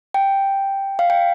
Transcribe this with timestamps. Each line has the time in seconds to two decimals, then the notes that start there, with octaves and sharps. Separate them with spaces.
0.14 G5
0.99 F5
1.10 G5